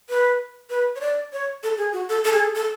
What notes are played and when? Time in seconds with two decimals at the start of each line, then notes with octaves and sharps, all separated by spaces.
0.09 B4
0.70 B4
0.96 C#5
1.01 D5
1.33 C#5
1.63 A4
1.78 G#4
1.93 F#4
2.09 A4
2.25 A4
2.33 G#4
2.40 A4
2.55 A4